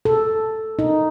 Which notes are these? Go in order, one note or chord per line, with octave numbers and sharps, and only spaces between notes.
A4
D#4